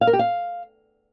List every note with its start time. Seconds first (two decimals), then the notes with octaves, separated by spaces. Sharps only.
0.01 F5
0.07 A#4
0.13 G4
0.19 F5